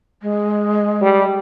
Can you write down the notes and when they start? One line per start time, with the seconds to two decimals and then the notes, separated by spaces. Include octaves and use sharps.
0.22 G#3
1.02 G3